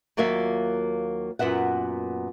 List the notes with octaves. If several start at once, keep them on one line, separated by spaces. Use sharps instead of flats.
D#2 F#3 A#3 F4 E5
F#2 A#2 B3 E5 F#5